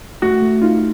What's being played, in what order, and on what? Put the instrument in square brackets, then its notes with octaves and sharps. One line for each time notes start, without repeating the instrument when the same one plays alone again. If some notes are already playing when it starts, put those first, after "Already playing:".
[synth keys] A3 [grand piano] F#4
[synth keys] A3
[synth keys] D#4 [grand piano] F4